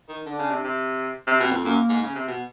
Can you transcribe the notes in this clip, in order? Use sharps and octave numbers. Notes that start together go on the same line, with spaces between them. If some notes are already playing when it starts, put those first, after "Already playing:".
D#3
D3 D4
C#3
C3
C3
C3
B2 C4
F2
F#2 A#3
G#2
C#3
C3
B2